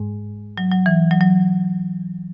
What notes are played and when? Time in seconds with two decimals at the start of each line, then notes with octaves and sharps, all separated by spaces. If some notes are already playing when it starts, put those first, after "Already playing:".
Already playing: G#2 G#3
0.58 F#3
0.71 F#3
0.86 E3
1.11 F#3
1.21 F#3